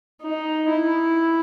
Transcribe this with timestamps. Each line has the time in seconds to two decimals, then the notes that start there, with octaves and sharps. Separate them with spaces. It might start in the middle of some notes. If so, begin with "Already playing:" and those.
0.22 D#4
0.69 E4